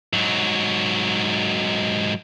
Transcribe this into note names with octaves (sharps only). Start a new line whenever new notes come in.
G#2 F#3